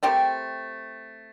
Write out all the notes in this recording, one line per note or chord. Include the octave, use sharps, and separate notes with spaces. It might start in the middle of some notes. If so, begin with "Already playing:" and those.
A3 C4 G4 A#4